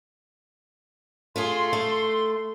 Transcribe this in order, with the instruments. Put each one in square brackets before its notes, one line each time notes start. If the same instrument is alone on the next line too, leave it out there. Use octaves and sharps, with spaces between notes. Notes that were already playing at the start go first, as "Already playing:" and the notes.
[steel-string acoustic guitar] A3 F4 G#4 [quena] C6
[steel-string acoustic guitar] A3